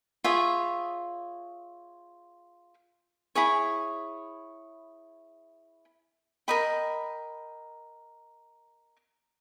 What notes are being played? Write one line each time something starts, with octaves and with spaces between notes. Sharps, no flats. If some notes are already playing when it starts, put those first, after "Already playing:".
F4 G#4 C#5 E5
E4 G#4 C#5
A#4 D#5 G5 B5